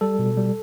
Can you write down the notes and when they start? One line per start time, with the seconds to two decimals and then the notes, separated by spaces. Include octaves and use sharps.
0.01 G3 A4
0.19 B2
0.37 G3